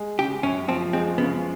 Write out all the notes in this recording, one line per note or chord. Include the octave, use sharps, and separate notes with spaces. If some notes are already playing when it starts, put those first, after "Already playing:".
Already playing: G#3
C#3 G4
F#2 C#4
F3 C4
G#3 C4
C#3 B3